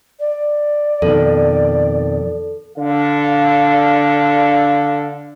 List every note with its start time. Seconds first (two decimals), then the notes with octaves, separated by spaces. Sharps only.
0.20 D5
1.02 F2 B2 D#3 A4
2.77 D3 F5